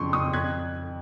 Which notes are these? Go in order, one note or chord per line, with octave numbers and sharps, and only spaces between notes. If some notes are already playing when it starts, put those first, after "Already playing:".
Already playing: F2 C#3 F3 C6 C#6
F2 C#6 D#6
F2 F#6 G#6